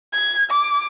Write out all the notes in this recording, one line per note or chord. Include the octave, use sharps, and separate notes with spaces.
G#6
D6